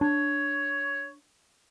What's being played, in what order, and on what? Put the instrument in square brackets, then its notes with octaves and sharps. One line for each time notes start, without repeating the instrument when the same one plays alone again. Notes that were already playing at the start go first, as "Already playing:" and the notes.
[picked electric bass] D4 [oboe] C#5